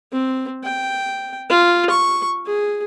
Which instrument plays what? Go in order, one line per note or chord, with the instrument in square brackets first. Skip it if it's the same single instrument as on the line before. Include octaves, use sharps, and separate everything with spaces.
[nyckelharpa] C4
G5
F4
C#6
G#4